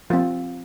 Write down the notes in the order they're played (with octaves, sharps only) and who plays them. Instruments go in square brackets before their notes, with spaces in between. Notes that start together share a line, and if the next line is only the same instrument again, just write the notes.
[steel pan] F3 C4 F4